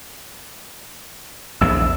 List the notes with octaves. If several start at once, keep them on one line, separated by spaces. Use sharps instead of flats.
A#1 E2 E6